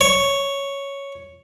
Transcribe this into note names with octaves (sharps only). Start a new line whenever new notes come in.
C#5